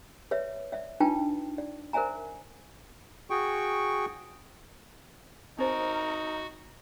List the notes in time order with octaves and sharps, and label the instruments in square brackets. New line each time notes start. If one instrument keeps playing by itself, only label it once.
[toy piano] B4 C#5 D5 E5
D5 E5
D4 D#4 F4 B4 G5 A5
D5
A#4 C5 D5 E5 G#5 A#5
[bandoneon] F#4 G#4 G5 C#6
[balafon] C4 C5 [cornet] D#4 [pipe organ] F#4 [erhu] A#4